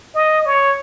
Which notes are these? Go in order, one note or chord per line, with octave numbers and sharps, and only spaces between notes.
D#5
C#5